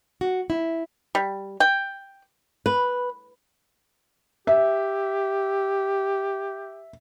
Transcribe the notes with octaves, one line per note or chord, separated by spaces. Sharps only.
F#4
E4
G3
G5
B4
G4 E5